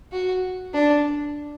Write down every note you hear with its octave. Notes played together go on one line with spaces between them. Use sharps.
F#4
D4